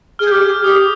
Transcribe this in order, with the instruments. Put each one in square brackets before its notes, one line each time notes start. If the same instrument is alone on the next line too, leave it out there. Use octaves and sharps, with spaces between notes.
[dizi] G#4 [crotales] F6
[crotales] G6
[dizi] G4 [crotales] F6
[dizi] G#4
[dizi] G4 [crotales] D#6